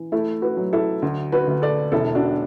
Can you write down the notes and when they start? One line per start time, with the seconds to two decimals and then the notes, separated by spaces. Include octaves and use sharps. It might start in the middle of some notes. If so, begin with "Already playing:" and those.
Already playing: E3
0.12 A3 E4 A4
0.42 F#4 B4
0.57 F#3
0.73 E4 A4
1.02 D2
1.32 F#4 B4
1.47 D2
1.62 A4 D5
1.92 E1 E4 A4
2.15 D4 F#4